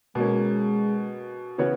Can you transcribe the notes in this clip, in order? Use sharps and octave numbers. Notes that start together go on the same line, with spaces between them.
B2 G#3 A#3 C#4
C#3 E3 B3 F#4 C#5